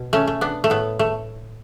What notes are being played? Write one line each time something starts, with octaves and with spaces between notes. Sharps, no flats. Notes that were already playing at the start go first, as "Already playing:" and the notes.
Already playing: B2
A3 C#4
A3
B3 D4
A3
A2 B3
A3